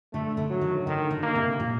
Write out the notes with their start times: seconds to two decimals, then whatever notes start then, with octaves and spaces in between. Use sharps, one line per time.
0.13 D3 A3
0.37 D3
0.50 F#3
0.61 D#3
0.87 D3 D#3
1.11 D3
1.23 A#3
1.35 C3
1.60 A#2